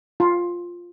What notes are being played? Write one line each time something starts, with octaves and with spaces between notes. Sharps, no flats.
F4